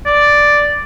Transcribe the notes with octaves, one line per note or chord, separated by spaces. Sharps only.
D5